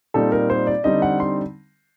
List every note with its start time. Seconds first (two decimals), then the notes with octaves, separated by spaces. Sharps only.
0.14 A#2 G3 C4 D#4 A4
0.32 A#4
0.50 C5
0.67 D5
0.84 D3 G3 C4 D#4 D#5
1.02 F#5
1.20 C6